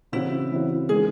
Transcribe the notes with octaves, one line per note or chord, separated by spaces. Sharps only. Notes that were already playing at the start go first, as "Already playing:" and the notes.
C#3 E3 C4 E4 F#4
C#3 E3 C4 F#4
D#3 G#3 C4 G#4